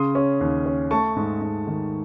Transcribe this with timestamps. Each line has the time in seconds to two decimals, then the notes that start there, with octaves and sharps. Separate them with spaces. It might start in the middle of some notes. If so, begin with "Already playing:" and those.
Already playing: C#3 C6 D#6
0.15 C#4
0.41 D#2
0.66 C#4
0.91 A3 A5 C#6
1.16 G#2
1.41 G#2
1.67 D#3